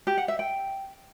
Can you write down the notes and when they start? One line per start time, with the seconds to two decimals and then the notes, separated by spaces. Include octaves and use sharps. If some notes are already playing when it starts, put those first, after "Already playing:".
0.07 G4
0.18 F#5
0.28 E5
0.39 G5